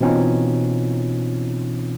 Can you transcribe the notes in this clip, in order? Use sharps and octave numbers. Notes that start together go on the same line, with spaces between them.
B2 E3 C4 C#4 D#4 F4